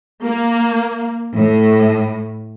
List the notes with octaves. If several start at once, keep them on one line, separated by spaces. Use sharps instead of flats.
A#3
A2